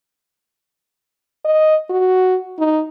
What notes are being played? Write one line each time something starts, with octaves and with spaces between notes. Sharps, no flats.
D#5
F#4
D#4